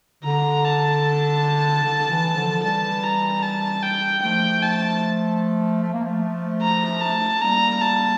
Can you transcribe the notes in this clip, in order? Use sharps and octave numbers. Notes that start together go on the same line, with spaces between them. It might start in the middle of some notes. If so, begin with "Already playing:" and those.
D3 A#5
A5
D3
E3
D3 F3
E3 G3 A5
A#5
A5
G5
F3 A3 G5
A5
A3
A#3
F3 A3
A#5
A5
G3 A#3 A#5
A5